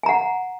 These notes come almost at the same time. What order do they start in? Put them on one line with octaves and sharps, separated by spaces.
G#5 A#5 F#5